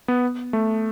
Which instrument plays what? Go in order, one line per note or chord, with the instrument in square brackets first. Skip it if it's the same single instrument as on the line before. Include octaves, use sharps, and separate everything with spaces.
[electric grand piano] B3
A3